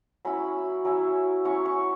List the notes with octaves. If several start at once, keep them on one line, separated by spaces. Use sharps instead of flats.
F#3 C#4 E4 B5
F#3 C#4 E4
F#3 C#4 E4 C#6
C#6